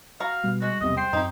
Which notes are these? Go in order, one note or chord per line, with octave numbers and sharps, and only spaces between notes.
F#4 F5 A#5
B2 G3
G#3 F#4
B1 E2 C3 D#5
C5 G5 C7
F#2 C4 D#4 G4